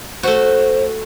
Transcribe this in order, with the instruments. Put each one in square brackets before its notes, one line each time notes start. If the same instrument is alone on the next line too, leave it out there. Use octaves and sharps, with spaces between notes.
[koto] A3 F#4 [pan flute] C5